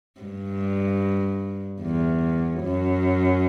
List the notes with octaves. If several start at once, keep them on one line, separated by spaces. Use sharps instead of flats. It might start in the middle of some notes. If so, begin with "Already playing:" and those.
G2
E2
F#2